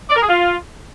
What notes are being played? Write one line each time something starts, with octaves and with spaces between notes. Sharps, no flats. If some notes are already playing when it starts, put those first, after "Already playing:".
D5
A#4
G#4
F4